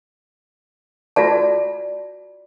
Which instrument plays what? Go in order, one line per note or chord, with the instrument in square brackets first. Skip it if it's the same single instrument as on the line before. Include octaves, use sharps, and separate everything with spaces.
[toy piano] F4 F#4 D5 A5